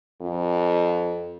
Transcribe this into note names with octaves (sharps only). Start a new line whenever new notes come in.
F2